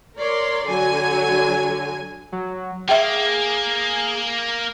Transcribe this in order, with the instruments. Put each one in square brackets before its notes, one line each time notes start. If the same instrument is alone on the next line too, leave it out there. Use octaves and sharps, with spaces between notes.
[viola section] A#4 C#5 D5 C6
D3 F#3 G#5
[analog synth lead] F#3
[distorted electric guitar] A#3 [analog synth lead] G#4 [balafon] E5 G5